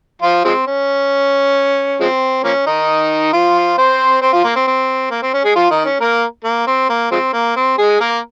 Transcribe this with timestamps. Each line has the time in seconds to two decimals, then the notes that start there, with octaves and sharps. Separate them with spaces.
0.22 F3 F4
0.45 F3 G#3 C4
0.67 C#4
2.00 F3 G#3 C4
2.44 F3 A#3 C#4
2.67 D#3 D#4
3.33 F3 F4
3.78 C4 C5
4.22 C4 C5
4.33 F3 F4
4.44 A#3
4.56 C4
4.67 C4
5.11 A#3
5.23 C4
5.34 C#4
5.44 G#3 G#4
5.56 F3 F4
5.70 D#3 D#4
5.85 C#4
6.00 A#3 A#4
6.44 A#3
6.67 C4
6.89 A#3
7.12 F3 G#3 C4
7.33 A#3
7.56 C4
7.78 G#3 G#4
8.00 A#3 A#4